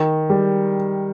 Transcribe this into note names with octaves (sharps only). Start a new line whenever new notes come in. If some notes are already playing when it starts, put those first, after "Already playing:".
Already playing: D#3
G3